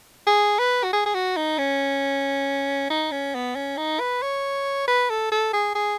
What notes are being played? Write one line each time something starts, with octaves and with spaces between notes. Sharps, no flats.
G#4
B4
F#4
G#4
G#4
F#4
D#4
C#4
D#4
C#4
B3
C#4
D#4
B4
C#5
B4
A4
A4
G#4
G#4